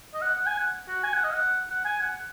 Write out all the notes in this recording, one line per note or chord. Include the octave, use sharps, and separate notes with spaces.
D#5
F#5
F#5
G#5
F#5
F#4
G#5
F#5
D#5
F#5
F#5
G#5
F#5